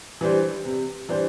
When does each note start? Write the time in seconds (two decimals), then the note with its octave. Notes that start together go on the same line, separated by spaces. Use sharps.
0.21 E3 G3 D4 C5
0.65 C3
1.09 E3 G3 D4 C5